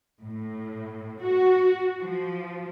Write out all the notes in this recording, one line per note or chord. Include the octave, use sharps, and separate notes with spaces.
A2
F#4
F3